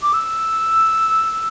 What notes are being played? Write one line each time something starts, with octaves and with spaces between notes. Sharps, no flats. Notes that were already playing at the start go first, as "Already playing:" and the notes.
D6
E6